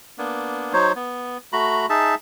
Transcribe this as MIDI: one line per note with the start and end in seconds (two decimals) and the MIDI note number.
0.18 0.73 58
0.18 0.73 59
0.18 0.73 62
0.73 0.92 54
0.73 0.92 63
0.73 0.92 72
0.73 0.92 73
0.96 1.37 59
1.53 1.86 57
1.53 1.86 66
1.53 1.86 82
1.53 1.86 83
1.90 2.15 63
1.90 2.15 68
1.90 2.15 76
1.90 2.15 81